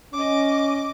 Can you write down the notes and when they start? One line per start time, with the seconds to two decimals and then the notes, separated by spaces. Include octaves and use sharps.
0.13 C#4 D#5 D6